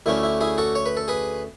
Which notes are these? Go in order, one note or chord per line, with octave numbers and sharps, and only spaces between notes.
D2 D3 A3 C#4 E4
E4
E4 G#4
F#4 A4
C#5
B4
A4
G#4 B4